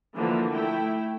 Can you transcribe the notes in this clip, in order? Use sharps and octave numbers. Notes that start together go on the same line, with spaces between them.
D3 E3 F3 A#3
A3 E4 G5